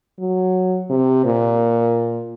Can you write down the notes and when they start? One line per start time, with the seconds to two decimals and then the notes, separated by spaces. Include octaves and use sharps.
0.19 F#3
0.90 C3
1.25 A#2